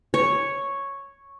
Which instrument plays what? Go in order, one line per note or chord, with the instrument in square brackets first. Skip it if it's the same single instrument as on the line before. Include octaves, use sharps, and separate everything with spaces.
[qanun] C#5